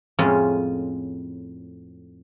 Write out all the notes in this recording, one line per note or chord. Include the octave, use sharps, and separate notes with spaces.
F2 A2 G#3 C#4 F4